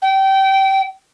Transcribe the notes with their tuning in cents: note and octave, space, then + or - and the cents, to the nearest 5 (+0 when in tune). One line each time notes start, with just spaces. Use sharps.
G5 -25